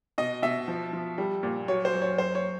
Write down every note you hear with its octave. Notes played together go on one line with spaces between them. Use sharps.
B2 D#5
B2 E5
F3
F3
G3
A#2
F#3 C#5
C5
F#2
C#5
F#2 C5
C#5